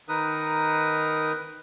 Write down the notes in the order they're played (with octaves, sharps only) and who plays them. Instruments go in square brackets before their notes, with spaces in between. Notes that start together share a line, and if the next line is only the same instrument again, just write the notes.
[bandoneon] D#3 D#4 A#4 B4 D#6